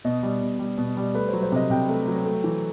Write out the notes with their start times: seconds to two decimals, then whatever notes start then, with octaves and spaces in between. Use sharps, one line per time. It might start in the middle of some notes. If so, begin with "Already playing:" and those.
0.05 B2 D#5
0.23 G3
0.41 B2
0.59 G3
0.78 B2
0.97 G3
1.15 A3 B4
1.29 C5
1.33 F#3
1.43 C5
1.52 C3 D#5
1.70 C3 G5
1.89 A3
2.08 F#3
2.25 A3
2.44 E3